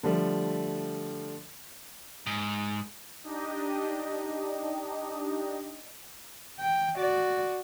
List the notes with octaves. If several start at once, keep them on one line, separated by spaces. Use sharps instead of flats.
D3 F3 G3 A3
G#2
D4 D#4 G4 D#5
G5
F#4 D5